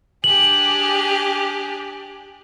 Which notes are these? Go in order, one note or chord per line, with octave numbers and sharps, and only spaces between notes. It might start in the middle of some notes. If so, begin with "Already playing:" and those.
D4 G4 G#4 F#7